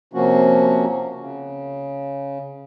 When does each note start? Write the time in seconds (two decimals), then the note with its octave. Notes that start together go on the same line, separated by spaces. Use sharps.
0.13 C3 F3 A#3 C#4 F#4
1.18 C#3